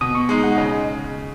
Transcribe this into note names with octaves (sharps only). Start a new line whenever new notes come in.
B2 D#6
C#6
G#3 D#4
F#5
C#3 D#5